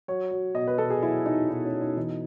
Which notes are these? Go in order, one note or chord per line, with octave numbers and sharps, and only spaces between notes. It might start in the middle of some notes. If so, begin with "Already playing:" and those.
F#3 C#5
F#3
B2 D#5
B4
B2 A4
G#4
F#3 E4
F#3 D#4
B2 D#4
C#4
B2
D#4
E3 D#4